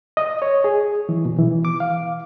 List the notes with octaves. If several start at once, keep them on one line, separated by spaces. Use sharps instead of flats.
D#5
C#5
G#4
E3
B2
E3
D6
F5